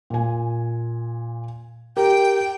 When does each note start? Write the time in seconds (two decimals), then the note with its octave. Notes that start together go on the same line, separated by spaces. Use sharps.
0.10 A#2 G#5
1.97 G4 A#4 G5